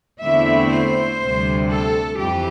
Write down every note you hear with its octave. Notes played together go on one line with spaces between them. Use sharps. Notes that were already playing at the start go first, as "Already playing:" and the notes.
E2 D3 A3 C4 E4 E5
C5
D2 C3 G3
A4
F2 E3 G4